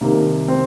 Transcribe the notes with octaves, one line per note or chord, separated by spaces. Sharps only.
C2 C3 D#3 A#3
C4